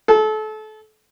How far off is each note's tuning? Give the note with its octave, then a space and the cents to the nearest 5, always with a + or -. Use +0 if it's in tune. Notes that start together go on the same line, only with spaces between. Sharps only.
A4 -30